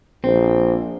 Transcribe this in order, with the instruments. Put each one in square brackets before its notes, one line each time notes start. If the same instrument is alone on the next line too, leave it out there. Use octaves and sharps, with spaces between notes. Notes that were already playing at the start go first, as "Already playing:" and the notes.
[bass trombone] A#1 [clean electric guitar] C4